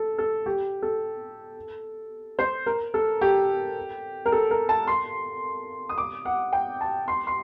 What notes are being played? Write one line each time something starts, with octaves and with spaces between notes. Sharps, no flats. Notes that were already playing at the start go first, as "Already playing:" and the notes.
Already playing: A4
A4
G4
A4
C5
A#4
A4
G4
A#4
A4
A#4
A5
C6
D#6
D6
F#5
G5
A5
C6
C6